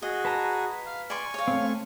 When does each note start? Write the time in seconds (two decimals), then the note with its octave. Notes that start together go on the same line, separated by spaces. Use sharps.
0.02 F#4 G#4 D#5
0.25 B4 A5 A#5
0.86 F5
1.10 D5 G#5 C6 C#6
1.34 C#5 F5
1.48 A3 C4